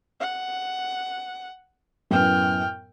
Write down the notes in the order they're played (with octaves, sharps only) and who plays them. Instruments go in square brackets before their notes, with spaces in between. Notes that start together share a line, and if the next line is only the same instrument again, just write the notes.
[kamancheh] F#5
[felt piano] F#2 A2 B3 [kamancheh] G5 F6